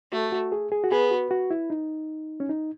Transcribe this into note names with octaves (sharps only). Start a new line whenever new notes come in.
A3 F#4
F#4
G#4
G#4
F#4
B3 G#4
F#4
F#4
E4
D#4
C#4
D#4